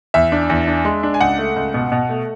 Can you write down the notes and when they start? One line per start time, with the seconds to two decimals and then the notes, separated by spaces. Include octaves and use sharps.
0.14 E2 E5
0.32 D4
0.50 E2
0.67 D4
0.85 G#3
1.03 D4
1.14 G#5
1.21 C#2 F#5
1.39 A3
1.56 C#2
1.74 B2
1.92 B2
2.09 A3